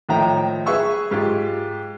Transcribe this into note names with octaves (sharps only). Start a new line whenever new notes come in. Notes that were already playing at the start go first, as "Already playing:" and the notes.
A2 D#3 F3 E5 G5 A#5
G#4 B4 E5 C#6 E6
G#2 F4 G4